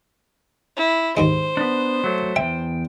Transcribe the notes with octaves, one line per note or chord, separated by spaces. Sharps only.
E4
D#2 G#2 G#3 C5
B3 D4
F#3 A3
E2 F3 E5 G5